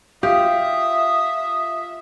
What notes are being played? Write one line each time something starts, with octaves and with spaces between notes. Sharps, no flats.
F4 G4 E5 D#6